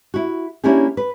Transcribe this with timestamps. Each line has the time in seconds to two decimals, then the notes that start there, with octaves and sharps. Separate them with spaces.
0.14 E4 F#4
0.64 A#3 C#4 D4 E4 G4 G#4
0.97 B4